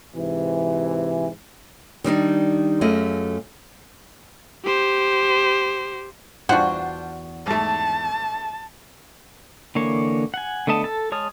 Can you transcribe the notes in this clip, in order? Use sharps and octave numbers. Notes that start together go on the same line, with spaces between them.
G#2 C3 E3
D#3 G3 D4 D#4
F#2 A3 F4 G#4 D#5
G4 C5
E2 D4 F4 F#4 C5
G#2 A3 A5
D3 E3 A#3 C#5
F#5 G#5
D3 A3 B3 D#5 A5
A4 A5
G#3 C#5 A5 D#6 F6